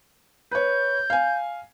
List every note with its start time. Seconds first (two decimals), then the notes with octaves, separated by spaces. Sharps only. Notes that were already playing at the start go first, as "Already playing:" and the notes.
0.51 B4 C#5 G6
1.10 F5 G#5